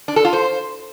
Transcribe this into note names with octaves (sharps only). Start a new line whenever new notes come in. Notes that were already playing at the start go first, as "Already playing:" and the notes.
D4
A4
F4
C5